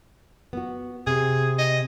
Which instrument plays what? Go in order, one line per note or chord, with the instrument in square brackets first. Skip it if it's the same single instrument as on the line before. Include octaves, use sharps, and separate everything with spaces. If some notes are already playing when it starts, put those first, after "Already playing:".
[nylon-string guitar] B3 F#4
[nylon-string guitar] C3 [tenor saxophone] G#4
[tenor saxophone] D#5